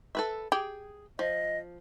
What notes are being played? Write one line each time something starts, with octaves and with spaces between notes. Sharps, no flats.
A4 B4 E5
G4 G#4 G5
F3 D#5